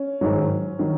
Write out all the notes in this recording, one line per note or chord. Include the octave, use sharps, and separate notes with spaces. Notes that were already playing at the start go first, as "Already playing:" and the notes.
Already playing: C#4
G#2 D#3 F#3
D#3 F#3